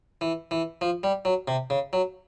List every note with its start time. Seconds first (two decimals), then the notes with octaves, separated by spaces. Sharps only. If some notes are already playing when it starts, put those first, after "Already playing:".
0.21 E3
0.51 E3
0.81 F3
1.03 G3
1.25 F#3
1.48 C3
1.70 C#3
1.93 F#3